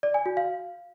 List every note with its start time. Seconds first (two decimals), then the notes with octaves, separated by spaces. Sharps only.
0.03 D5
0.14 G#5
0.26 F#4
0.37 F5